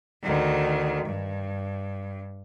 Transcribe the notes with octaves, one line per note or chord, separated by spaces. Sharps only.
D2 D#3
G2